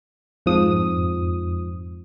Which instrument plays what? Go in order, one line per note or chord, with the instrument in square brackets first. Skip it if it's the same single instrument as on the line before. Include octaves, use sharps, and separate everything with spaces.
[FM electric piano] F2 G#2 F3 D#6